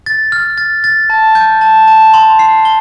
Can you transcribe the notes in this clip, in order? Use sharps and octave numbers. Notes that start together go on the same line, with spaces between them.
A6
F6
A6
A6
A5
G6
A5
A5
C6
C7
G7